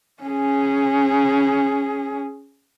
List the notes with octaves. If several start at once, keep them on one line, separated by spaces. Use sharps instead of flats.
C#4 G#4